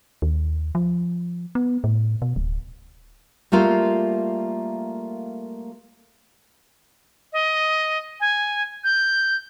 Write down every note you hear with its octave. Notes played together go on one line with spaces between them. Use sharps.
D#2
F3
B3
A2
B2
D1
G3 A3 A#3 F4
D#5
G#5
G6